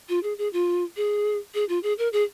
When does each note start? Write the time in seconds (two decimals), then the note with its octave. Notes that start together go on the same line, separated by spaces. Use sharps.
0.09 F4
0.23 G#4
0.38 G#4
0.53 F4
0.97 G#4
1.54 G#4
1.69 F4
1.83 G#4
1.98 A#4
2.13 G#4